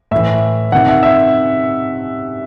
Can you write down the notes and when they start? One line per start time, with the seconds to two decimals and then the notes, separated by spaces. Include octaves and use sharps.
0.11 A2 E3 E5
0.72 C3 D#3 F#5
0.88 E5
1.03 E5